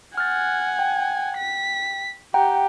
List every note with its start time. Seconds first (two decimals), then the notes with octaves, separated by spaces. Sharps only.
0.18 F#5 G#5 F6 F#6 A6
0.79 G5
1.37 B6
2.34 G4 F#5 G5 A#5